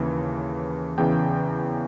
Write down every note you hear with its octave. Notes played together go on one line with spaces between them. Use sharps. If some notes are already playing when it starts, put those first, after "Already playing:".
Already playing: D#2 C#3 E3
E2 C#3 E3 G5